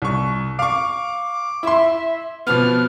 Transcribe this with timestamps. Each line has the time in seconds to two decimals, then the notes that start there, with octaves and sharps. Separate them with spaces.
0.02 C2 C#6
0.59 F5 C#6 D6
1.63 E4 E5 C6
2.47 B2 F3 B3 F6